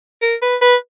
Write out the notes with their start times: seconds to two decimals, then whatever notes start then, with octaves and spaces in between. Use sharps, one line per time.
0.21 A#4
0.42 B4
0.62 B4